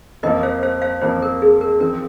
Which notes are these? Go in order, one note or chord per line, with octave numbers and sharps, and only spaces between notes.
F2 F3 A#3 A#4 D#5
C5 F5
C5 F5
C5 F5
F2 F3 A#3 C5
A#4
G#4
A#4
F3 C4 A#4